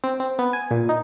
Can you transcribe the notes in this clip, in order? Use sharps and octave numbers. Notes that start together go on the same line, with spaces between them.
C4
C4
B3
G#5
A#2
D#4